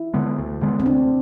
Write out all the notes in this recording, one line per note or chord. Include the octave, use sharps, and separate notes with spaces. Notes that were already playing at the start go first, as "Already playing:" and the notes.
Already playing: E4
D3 G#3 B3
D2
D3 G#3 B3
C4
D2 D4